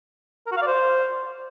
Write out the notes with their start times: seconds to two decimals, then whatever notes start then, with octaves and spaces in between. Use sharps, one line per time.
0.46 A#4
0.52 F#4
0.57 F5
0.62 D5
0.67 C5